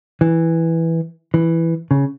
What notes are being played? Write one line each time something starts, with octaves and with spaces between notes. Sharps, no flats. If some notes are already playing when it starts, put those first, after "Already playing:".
E3
E3
C#3